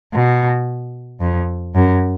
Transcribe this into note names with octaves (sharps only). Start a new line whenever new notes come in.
B2
F2
F#2